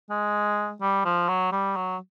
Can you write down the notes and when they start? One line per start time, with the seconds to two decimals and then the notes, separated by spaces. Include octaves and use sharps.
0.10 G#3
0.81 G3
1.05 F3
1.29 F#3
1.52 G3
1.76 F#3